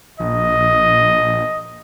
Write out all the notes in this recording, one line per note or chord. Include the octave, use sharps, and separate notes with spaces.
A#1 D#5